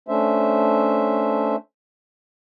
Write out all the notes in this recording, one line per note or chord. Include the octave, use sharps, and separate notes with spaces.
A3 C#4 D4 C5 E5